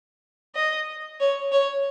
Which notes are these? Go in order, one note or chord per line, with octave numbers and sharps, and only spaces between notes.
D#5
C#5
C#5